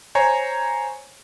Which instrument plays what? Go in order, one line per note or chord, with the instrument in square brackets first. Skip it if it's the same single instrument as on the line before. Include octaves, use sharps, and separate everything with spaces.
[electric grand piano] C5 C#5 G#5 A#5